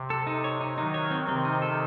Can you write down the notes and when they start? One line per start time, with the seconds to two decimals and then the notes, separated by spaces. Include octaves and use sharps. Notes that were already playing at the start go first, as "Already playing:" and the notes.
Already playing: C3
0.10 A4
0.27 D#4
0.44 C#5
0.61 D#4
0.78 D#3 F#3 D#4
0.94 C#5
1.11 C4
1.29 C3 D#3 C4
1.45 D#4
1.62 A4